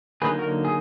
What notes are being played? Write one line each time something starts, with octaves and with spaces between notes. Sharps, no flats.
D3 F#3 A#3 D#4 G#4 B4
F#4 A#4
G#4